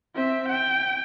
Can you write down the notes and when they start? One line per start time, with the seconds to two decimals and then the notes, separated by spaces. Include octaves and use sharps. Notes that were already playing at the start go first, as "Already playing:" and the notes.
0.15 C4 E5
0.49 G5